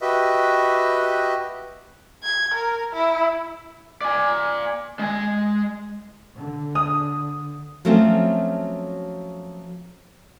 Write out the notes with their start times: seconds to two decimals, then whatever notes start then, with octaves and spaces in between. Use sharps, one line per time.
0.01 F#4 G4 B4 D#5 E5
2.24 G#6
2.55 A#4
2.93 E4
4.01 D5 G#5
4.99 G#3 G#5
6.35 D3
6.75 D#6
7.85 F3 F#3 A3 C4 C#4